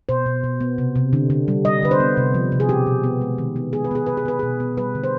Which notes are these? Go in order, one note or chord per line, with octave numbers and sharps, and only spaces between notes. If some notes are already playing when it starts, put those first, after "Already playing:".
B2 C5
B2
B2
B3
C3
C3
D3
D3
G3
G3 D#5
D3 B4
C5
B3
C3
F3
C3
G#4
B2 G4
B2
B3
G#3
D#3
B3
B3 G#4
B4
B3 G#4
B3 B4
G#4
B3 B4
B2 G#4
B3
G3 B4
D3
C5